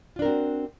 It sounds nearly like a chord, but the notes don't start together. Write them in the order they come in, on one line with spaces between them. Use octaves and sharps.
F4 D4 A#4 C4 F#4